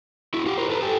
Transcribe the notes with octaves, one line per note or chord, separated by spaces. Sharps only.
E4 F#4
F4 G4
A#4 C5
A4 B4
G4 A4